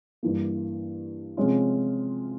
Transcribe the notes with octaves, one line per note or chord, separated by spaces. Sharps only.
G2 E3 A#3
C3 F3 G#3 C#4 F4